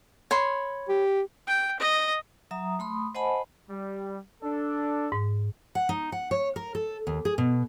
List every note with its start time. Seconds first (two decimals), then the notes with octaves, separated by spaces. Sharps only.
0.31 C#5 B5 C6
0.89 G4
1.47 G5
1.79 D#5
2.51 F#3 E5 A#5 D#6
2.79 A3 B5 C6 D#6
3.15 C5 D#5 F#5 G#5 A5 B5
3.69 G3
4.43 D4 A4
5.12 G#2
5.75 F#5
5.89 D#4
6.12 F#5
6.31 C#5
6.56 A#4
6.75 A4
7.07 D#2
7.25 G#4
7.38 B2